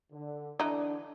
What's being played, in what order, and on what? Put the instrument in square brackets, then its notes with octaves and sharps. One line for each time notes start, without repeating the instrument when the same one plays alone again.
[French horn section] D3
[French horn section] D3 D4 [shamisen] E3 D#4